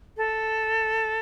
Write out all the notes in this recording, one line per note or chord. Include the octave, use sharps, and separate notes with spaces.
A4